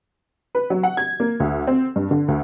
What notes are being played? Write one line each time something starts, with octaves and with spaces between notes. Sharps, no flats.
B4
F#3
F#5
G#6
A#3
D2
C4
G2
D3
D2